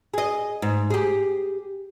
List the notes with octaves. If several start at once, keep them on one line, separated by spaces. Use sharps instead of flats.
G#4 D#5
G#2
G4 G#4